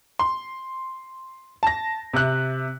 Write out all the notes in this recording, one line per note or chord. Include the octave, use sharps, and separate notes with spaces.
C6
A5 A#6
C3 E5 F#6